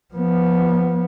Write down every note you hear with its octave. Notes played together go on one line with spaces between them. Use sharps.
F3 B3